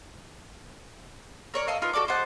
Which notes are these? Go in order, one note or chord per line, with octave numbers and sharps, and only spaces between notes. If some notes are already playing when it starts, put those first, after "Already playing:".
A#4 C#5 D5
A4 D#5 F5
D#4 F4 A#4 B4
F#4 A4 D5 D6
C5 D#5 F#5 A5